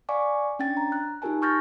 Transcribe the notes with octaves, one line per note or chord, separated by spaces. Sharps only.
D5 F5 G#5 C#6 D6
C#4 D4 G5 A6
A#5
F#6
D#4 F4 G4 A#4 G#5 A5
C#6 F6 G6 A6 A#6